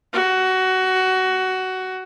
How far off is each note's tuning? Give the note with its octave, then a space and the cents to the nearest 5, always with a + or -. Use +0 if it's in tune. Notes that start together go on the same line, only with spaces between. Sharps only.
F#4 +15